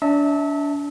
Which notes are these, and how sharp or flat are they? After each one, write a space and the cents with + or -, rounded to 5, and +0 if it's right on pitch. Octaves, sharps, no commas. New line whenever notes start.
D4 -30 E5 -30 A5 +30